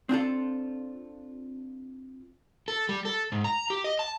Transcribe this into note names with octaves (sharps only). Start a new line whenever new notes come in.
C4 D4 F4 A4
A4
G3
A4
G#2
A#5
G4
D#5
A5